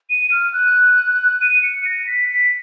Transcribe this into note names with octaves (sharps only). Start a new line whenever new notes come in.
D#7
F6
F#6
D#7
C#7
A#6
B6
B6